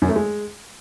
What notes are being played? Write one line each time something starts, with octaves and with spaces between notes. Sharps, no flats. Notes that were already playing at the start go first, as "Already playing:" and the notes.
F#2
A3
G#3